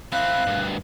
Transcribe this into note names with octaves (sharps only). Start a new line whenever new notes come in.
C4 E4 F5 F#6
D2 G2